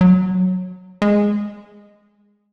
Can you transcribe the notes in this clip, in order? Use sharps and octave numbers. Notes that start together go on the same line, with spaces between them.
F#3
G#3